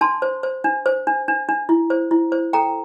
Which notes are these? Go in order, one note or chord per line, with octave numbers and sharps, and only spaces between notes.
D4 A5 C6
C5
C5
D4
C5
D4
D4
D4
E4
C5
E4
C5
A4 G5 A#5